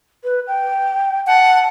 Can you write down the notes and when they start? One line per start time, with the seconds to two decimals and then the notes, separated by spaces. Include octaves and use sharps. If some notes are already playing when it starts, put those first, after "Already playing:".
0.23 B4
0.47 G5
1.27 F#5 A5